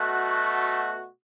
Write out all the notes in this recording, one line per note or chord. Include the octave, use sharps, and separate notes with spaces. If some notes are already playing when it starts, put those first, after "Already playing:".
Already playing: B2 A3 F#4